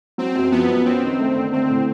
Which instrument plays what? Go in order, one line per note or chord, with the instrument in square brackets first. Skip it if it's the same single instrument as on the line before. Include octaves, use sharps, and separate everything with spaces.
[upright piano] F#3 [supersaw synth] C4
[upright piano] F#2
[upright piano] F3 [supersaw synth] B3
[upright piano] F#2
[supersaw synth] C4 [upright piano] C#4
[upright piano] D#3
A3
D3
[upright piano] A3 [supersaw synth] C4
[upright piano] A2